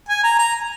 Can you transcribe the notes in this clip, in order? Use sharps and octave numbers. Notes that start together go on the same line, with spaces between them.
G#5
A#5
A#5